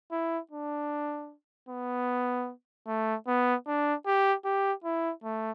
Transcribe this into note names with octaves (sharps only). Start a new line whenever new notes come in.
E4
D4
B3
A3
B3
D4
G4
G4
E4
A3